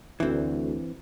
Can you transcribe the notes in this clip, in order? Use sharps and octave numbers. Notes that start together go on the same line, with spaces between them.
D2 E3 C4